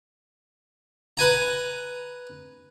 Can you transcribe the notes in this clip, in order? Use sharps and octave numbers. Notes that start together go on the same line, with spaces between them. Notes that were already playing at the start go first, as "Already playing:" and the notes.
B4 G#5 A#5